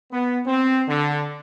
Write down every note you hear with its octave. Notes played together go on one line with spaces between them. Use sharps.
B3
C4
D3